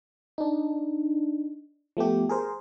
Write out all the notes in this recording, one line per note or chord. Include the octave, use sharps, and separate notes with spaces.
D4 D#4
F3 A3 B3 G4
G#4 A#4 C5